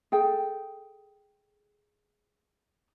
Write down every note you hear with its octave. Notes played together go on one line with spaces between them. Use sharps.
G#4 A4 G5